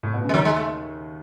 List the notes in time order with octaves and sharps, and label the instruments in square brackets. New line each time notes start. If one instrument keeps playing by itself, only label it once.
[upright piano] A2
B2
C#3
[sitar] G#3
[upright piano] D#2 D#3 [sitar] F#3
[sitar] G#3
A3